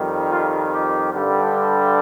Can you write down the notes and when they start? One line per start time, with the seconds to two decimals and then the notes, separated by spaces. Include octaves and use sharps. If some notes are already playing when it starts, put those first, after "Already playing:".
Already playing: F2 D#3 G3
0.29 F4
0.71 G4
1.12 G2 D3 G3